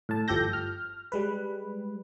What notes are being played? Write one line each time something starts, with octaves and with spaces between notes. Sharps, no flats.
A2 A5
G1 F3 G4 A4 G6 A#6
F6
G3 G#3 B4